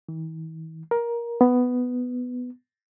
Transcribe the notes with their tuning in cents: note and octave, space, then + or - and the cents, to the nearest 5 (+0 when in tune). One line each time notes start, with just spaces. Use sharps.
E3 -45
A#4 +15
B3 +10